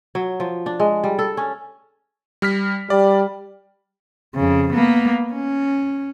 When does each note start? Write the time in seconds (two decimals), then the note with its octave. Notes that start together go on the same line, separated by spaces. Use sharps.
0.15 F#3
0.40 F3
0.66 D4
0.80 G#3
1.04 G3
1.19 A4
1.37 C#4
2.42 G3 F6 B6
2.90 G3 D5
4.35 F2 C#3
4.73 A#3 B3
5.33 C#4